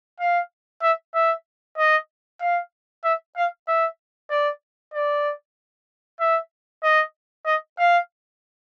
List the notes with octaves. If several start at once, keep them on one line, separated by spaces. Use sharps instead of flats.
F5
E5
E5
D#5
F5
E5
F5
E5
D5
D5
E5
D#5
D#5
F5